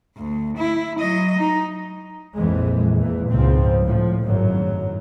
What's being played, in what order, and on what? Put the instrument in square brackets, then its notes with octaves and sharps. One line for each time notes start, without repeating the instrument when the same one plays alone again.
[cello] D2
E4
F#3 D#5
D#4
[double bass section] A#1 F2 E3 G#3
E2 A#2 E3
C#2 G#2 F3 C4
A2 F3
G#1 F#2 A2 F#3